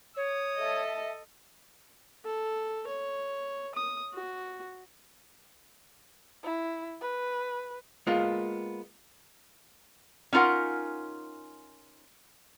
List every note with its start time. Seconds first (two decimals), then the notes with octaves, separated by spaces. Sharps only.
0.17 C#5 D#6
0.58 A4 D#5 E5 A5
2.25 A4
2.87 C#5
3.75 D#6
4.14 F#4
6.44 E4
7.01 B4
8.07 G#3 A#3 B3 F4
10.33 C#4 D#4 F4 A#4 F#5